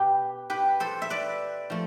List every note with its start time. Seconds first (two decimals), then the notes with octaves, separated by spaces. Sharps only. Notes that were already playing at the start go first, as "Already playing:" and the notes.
Already playing: B2 G4 B4
0.50 G4 B4
0.80 A4 C5
1.02 E5
1.10 B4 D5
1.70 F3 A3